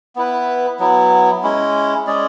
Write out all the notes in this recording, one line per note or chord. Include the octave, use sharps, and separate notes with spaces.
B3 E4 B4
F#3 B3 E4
G#3 C#4 E4
G#3 C#4 G#4 D5